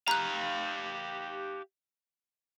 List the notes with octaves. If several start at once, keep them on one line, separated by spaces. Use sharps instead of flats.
G4 F5 A#5 F#6